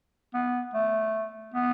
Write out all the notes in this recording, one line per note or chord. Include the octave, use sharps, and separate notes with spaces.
B3
A3
B3